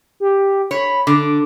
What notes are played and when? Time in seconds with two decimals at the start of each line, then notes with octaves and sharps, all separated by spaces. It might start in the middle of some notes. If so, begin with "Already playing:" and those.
0.20 G4
0.71 C#5 B5
1.07 D3 D6